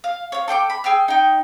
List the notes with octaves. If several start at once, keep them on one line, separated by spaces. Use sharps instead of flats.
F5
C#5 F5
A4 G5 C6 D6
B5
G#4 G5 E6 F6
D#4 G5